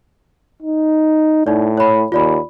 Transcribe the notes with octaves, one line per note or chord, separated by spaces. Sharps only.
D#4
A2 D#4 D5
C#5 B5
D#2 F4 D5 B5